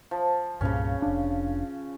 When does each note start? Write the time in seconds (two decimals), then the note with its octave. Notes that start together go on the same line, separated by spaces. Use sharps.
0.11 F3
0.61 C2 G2 A#2 C#3 C#4
1.02 F1 D4